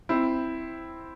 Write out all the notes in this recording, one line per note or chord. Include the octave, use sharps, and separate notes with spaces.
C4 E4